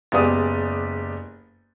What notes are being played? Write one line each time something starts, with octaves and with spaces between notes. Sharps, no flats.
F#1 G#3 B3 G4 D5 D#6